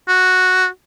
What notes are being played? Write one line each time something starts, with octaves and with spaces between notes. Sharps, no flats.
F#4